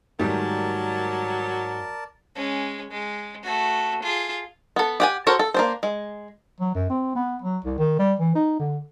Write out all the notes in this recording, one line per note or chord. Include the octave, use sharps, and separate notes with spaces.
G#2 D#3 F#3 G3 A3 A#4 D5 A5
G#3 C#4
G#3
A3 F#4
F4 G#4
B3 A4
G4 F#5 G#5
F#4 A4 A#4 C5 C#5
A4
A#3 D4 C5
G#3
F#3
F#2
C4
B3
F#3
C2
D#3
G3
E3
D#4
D3